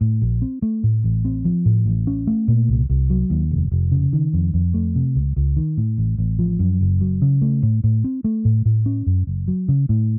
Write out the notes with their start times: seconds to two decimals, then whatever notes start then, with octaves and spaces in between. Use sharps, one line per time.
0.01 A2
0.22 A#1
0.42 C4
0.62 A3
0.84 A2
1.04 A1
1.25 C4
1.45 F3
1.66 A2
1.86 A1
2.07 C#4
2.27 A3
2.48 A#2
2.68 C2
2.90 C2
3.10 F#3
3.30 D#2
3.52 F1
3.72 F1
3.92 C#3
4.13 D#3
4.33 F2
4.54 F2
4.74 A3
4.96 C3
5.15 C#2
5.36 C#2
5.57 D#3
5.77 A2
5.98 A1
6.18 A1
6.39 F3
6.59 F#2
6.81 F#1
7.01 F#3
7.22 C#3
7.42 A3
7.63 A2
7.84 A2
8.04 C4
8.24 A3
8.45 A2
8.65 A2
8.86 C#4
9.06 F#2
9.27 F#1
9.48 F#3
9.68 C#3
9.89 A2